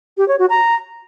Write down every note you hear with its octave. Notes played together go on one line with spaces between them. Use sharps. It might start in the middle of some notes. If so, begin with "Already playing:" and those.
G4
C#5
F#4
A#5